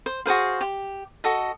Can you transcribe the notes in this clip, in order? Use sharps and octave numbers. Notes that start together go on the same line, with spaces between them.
C5
F#4 G#4 C5 F5
G4
F#4 A4 D#5